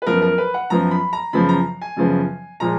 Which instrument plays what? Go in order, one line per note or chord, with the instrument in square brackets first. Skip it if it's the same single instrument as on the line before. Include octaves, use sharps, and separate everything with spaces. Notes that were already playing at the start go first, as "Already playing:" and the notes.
[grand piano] B4
F#2 F3 B3 A#4
A#4
B4
F#5
F#2 F3 B3 A#5
B5
A#5
F#2 C#3 F3 B3 B5
A#5
G#5
F#2 C#3 F3 B3
A#2 F3 G#3 A#5